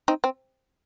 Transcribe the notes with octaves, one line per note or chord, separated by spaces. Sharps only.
C4 D#4
C4